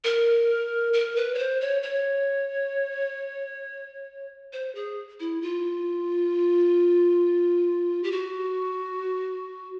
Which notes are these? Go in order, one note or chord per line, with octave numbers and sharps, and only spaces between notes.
A#4
A#4
B4
C#5
C5
C#5
C#5
C5
G#4
E4
F4
G4
F#4